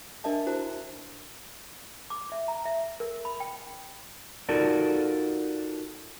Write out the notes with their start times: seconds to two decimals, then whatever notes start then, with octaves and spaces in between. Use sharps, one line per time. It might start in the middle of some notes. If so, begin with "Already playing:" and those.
0.24 D4 A#4 D#5 E5 A5
0.46 E4 F#4 C5 A#5
2.10 D6
2.32 E5
2.48 A#5
2.65 E5
3.00 A#4
3.25 B5
3.40 G5
4.49 D#4 F4 F#4 A4 A#4 D5